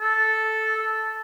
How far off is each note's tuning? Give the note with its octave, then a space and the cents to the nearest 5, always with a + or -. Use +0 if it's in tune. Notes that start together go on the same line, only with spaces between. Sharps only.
A4 -5